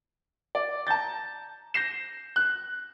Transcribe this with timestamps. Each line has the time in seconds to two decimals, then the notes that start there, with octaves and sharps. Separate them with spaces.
0.55 D5
0.87 A5 A#5 G6 A6
1.74 G6 A#6 C7 E7
2.36 F#6